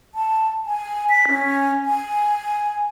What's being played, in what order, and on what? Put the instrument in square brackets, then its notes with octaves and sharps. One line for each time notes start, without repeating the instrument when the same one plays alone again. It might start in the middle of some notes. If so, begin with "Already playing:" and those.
[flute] A5
G#5
B6
C#4
G#5